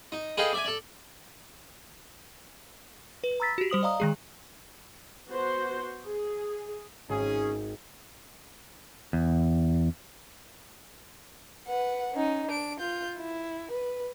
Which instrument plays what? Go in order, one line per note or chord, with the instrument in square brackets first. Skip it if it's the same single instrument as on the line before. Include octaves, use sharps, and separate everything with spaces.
[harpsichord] D#4
G#4 A4 B4 D#5 F5 G5
D5 E5 G#5
A4 D5
[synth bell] B4
A#5 B5 E6 A6 B6
F#4 G4
G3 C5 D#6 F#7
D5 D#5 F5 A#5 D#6
D#3 G#3 G#4
[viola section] B3 F#4 C5
G#4
[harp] G#1 [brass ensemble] C#4 G#4
[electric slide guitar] E2
[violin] B4 F#5
C#4 D#4
D4 D7
F4 G6
E4
B4